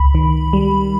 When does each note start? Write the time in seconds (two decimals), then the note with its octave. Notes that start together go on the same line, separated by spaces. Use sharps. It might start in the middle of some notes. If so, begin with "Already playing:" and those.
Already playing: C#2 B5
0.15 D#3
0.53 G3